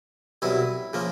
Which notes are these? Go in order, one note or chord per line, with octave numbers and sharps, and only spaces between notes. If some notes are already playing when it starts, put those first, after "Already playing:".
C2 B2 F#3 E4
C#3 F3 A#3